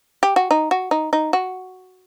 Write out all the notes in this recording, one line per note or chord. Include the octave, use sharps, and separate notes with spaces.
G4
F#4
D#4
F#4
D#4
D#4
F#4